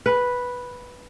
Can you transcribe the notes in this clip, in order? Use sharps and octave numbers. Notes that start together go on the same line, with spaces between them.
B4